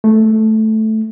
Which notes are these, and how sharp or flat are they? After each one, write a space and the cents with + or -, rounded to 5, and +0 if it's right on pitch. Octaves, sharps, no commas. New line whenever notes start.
A3 -5